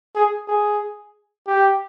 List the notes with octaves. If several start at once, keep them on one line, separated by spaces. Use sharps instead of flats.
G#4
G#4
G4